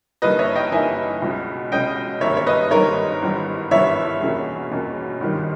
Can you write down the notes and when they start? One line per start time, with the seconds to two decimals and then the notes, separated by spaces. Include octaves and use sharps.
0.22 G1 G2 E3 A#3 D#4 B4 D#5
0.39 C#5 E5
0.55 D#5 G5
0.72 G1 G2 E3 A#3 D#4 E5 G#5
1.22 C#2 B2 G#3 C#4
1.72 C#2 B2 G#3 C#4 D#5 G5
2.21 G#1 G2 G3 A#3 D#4 C#5 E5
2.37 C#5
2.47 B4 D#5
2.71 G#1 G2 G3 A#3 D#4 A#4 C#5
3.22 G#1 G2 E3 G3 B3
3.71 G#1 G2 E3 G3 B3 C#5 E5
4.21 E2 B2 A#3 C#4 G#4
4.71 E2 B2 A#3 C#4 G#4
5.21 G#1 G2 D#3 G3